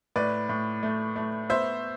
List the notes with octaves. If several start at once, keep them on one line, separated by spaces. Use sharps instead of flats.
A2 B4 D5
A2
A3
A3
B3 C5 E5